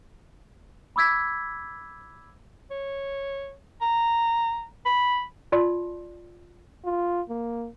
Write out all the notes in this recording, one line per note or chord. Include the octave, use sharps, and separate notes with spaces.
B5 D6 E6 G#6 B6
C#5
A#5
B5
F4 D5 A5 C6
F4
A#3